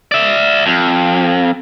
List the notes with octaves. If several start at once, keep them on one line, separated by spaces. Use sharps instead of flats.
D5 E5
F2